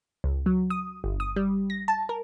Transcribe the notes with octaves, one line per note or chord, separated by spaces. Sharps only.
C#2
F#3
D#6
G1
D#6
G3
A#6
A5
A#4